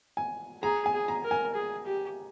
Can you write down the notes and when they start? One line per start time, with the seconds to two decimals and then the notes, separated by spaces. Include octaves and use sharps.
0.17 G#5
0.62 G#4 A#5
0.86 G#5
0.94 G#4
1.08 A#5
1.24 A#4
1.31 G#5
1.54 G#4
1.85 G4